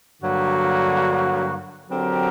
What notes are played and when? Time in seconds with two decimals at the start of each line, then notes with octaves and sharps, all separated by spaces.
0.20 G2 D3 F#3 A#3 F#4
1.89 D3 F#3 C4 G4 A#4